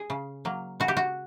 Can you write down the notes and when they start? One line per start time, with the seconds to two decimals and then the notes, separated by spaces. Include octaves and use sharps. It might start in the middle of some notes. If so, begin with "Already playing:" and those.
Already playing: G#4
0.10 C#3
0.45 F#3 A#3
0.80 C#3 F#4
0.88 G4
0.97 F#4